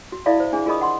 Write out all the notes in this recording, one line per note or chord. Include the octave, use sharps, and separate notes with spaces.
F#4
E4 A4 D5 E5 F5 B5
C5
D4 G#4
F4 G#4 A#4 D#5 B5 D#6
F#5 C6